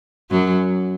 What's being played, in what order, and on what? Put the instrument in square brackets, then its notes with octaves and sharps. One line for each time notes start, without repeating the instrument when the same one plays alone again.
[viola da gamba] F#2 F#3